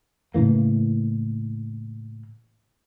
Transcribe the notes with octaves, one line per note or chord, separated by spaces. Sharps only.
A2 C#3 E3 A#3